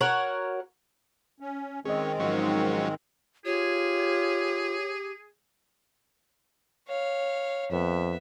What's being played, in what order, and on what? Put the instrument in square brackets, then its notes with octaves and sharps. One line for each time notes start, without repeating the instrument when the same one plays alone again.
[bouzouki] F#4 A#4 C#5 F#5
[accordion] C#4
[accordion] D#3 G#3 C4 [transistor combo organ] C#4 [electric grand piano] G#4 D#5
[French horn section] G#2 [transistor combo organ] F3 F#3 C#4
[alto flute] F4 [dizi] G4 [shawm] G#4 [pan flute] C#5
[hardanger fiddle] C#5 F5
[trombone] F2 [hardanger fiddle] B3 E5